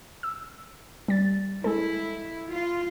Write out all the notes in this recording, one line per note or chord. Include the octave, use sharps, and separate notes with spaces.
E6
G3 A6
G#3 E4 A4
F4